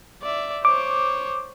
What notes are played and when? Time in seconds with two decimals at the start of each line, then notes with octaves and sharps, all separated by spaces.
0.22 D5 E5
0.65 C5 C#5 D6